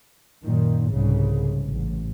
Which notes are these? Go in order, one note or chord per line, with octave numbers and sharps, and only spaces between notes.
F#2 A#2 D#3
C2 G#2 C#3
A1